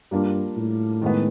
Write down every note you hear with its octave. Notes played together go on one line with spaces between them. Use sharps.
G2 G3 A#3 D4 F4
A2
D#3 G#3 B3